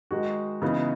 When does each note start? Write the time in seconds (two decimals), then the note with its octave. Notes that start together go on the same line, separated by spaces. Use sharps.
0.11 D#3 G#3 D#4 F#4
0.62 C#3 E3 B3 D#4